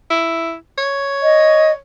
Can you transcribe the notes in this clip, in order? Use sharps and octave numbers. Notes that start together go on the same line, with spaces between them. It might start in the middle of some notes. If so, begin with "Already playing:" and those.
E4
C#5
D#5